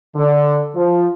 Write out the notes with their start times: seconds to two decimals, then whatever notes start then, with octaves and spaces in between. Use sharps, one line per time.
0.15 D3
0.75 F3